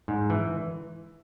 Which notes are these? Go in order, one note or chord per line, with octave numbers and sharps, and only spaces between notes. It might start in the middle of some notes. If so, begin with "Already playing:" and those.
G#2
E3